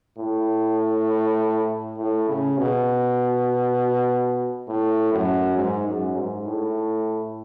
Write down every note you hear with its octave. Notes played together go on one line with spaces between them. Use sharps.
A2
A2
C#3
B2
A2
F#2
G#2
F#2
G#2
A2